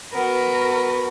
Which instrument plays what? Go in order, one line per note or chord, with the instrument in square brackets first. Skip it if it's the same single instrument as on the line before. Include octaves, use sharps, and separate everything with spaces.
[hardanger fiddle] B3 [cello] F#4 A#4